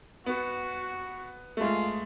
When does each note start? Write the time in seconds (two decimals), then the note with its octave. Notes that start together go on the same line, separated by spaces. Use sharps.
0.26 B3 F#4
1.57 A3
1.61 G#3 F4